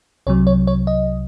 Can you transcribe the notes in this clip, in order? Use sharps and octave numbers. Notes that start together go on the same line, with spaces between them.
C2 C3 F#3 C#5
C#5
C#5
D#5